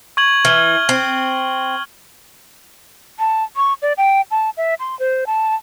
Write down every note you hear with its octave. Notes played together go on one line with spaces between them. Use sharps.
C#6 G#6 F#7
E3 F6 G7
C4
A5
C#6
D5
G5
A5
E5
C6
C5
A5